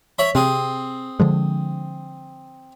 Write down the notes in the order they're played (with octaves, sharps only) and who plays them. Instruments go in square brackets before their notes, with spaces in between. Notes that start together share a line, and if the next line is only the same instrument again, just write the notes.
[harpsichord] C#5 E5 B5
[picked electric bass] C3 [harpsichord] C4 G#4
[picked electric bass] D3 F3 G#3